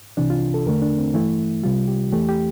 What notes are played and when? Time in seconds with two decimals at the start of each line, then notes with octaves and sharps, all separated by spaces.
0.17 C2 C3 E3 D4
0.30 F4
0.54 A4
0.66 E2 D3 A3 A#4
0.82 D4
0.98 C4
1.14 G2 E3 A3 E4
1.64 C2 C3 G3 F4
1.87 G4
2.12 E2 E3 A3 G4
2.29 G4